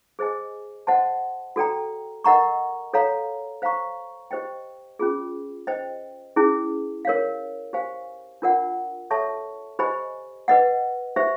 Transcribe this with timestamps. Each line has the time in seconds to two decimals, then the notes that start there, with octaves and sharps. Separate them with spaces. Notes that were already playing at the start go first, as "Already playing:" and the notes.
0.19 G#4 C5 D#5 G#5
0.87 C5 D#5 F#5 A5 C6
1.56 F#4 A4 D5 G5 A#5
2.24 A#4 D#5 F#5 A#5 C#6
2.93 A4 C#5 F5 A#5
3.62 C5 F5 A#5 C#6
4.31 G4 C5 D#5 G5
4.99 C#4 F4 G#4
5.67 C5 D#5 G5
6.36 C#4 E4 G#4
7.05 A#4 C#5 F5
7.73 G4 C5 F5 G#5
8.42 D4 F4 A#4 D5 F#5
9.11 A4 C#5 E5 A5 C#6
9.79 G4 C5 D#5 G#5 B5
10.48 B4 D#5 F#5
11.16 G4 C5 E5